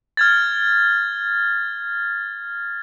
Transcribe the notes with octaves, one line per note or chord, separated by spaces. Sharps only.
F6 G#6 A6